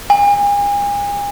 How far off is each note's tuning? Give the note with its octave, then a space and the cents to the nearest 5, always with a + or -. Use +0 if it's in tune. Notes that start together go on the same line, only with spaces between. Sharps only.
G#5 -40